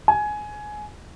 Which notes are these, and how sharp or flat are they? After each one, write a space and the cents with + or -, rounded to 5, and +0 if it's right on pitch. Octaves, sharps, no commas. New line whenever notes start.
G#5 +15